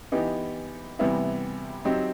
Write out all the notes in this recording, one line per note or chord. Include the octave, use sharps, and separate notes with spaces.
E3 B3 D#4 G4
C3 E3 G3 B3 E4
F#3 C4 D#4 G4